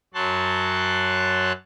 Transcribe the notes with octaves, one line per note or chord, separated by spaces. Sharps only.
F#2 F#3 C#5 A5 C6 F#6